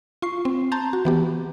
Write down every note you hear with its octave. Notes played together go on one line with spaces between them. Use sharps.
F4 C#6 C7
C4
A5 A#5 C6 G6 A6
F#4
E3 B3 G4